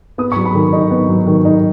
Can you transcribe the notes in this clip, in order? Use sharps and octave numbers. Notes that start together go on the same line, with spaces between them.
B3 D#6
C#6
F#3
B5
D#3
D#4
B3
F#3
D#3
D#4